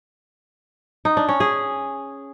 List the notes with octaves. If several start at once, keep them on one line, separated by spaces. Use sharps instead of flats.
D#4
D4
C#4
G#4